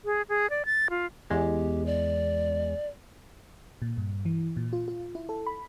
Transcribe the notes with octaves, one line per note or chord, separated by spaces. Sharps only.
G#4
G#4
D5
A6
F4
E2 G#3 G4
D5
A#2
G2
E3
A#2
F4
F4
E4
A4
B5